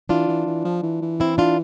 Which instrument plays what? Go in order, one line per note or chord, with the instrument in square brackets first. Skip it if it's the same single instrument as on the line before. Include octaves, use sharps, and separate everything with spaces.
[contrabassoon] E3 [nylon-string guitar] D4 F4
[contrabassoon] E3
E3
F3
E3
E3
[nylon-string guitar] C4 E4
D4 F4